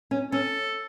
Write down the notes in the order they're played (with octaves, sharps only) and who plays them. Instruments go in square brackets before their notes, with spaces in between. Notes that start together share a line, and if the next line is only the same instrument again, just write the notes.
[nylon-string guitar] C#4
[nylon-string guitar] C#4 [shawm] A4